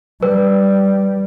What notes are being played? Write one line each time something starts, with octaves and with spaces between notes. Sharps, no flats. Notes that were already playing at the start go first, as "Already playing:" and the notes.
G3 B4